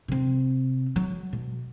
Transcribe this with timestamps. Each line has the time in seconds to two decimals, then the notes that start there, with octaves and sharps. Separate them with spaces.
0.08 C3 C4
0.96 F#3
1.33 B2